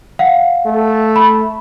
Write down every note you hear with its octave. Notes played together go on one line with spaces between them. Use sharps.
F5 F#5
A3
B5